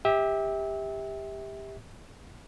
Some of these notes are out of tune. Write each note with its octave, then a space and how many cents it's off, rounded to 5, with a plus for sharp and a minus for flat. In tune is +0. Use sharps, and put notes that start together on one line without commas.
G4 +20 E5 -25